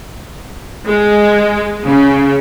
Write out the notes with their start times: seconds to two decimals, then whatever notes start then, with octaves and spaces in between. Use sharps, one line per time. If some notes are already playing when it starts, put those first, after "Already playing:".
0.86 G#3
1.87 C#3